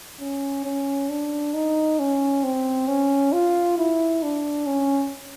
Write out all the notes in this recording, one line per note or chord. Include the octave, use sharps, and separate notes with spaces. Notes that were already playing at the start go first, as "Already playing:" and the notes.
C#4
C#4
D4
D#4
C#4
C4
C#4
F4
E4
D4
C#4